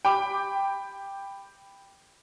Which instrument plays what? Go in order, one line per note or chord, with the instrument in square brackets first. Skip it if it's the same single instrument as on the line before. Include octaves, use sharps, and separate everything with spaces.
[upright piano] G5 B5 D6